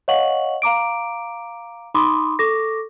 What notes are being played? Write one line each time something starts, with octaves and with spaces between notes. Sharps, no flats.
C#5 D#5 F5 F#5 C#6 F#7
F5 A#5 D6 D7
D#4 B5 C6 D6 D#6
A4 C#6 D6 A#6